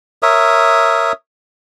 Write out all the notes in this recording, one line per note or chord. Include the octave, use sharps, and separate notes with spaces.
A#4 C#5 E5 D#6